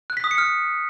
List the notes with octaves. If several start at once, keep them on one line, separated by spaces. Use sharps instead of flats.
F#6
B6
D#6
C#7
F6